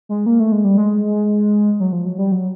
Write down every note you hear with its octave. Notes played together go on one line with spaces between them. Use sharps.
G#3
A#3
A3
G#3
G3
G#3
F#3
F3
F#3
G3
F#3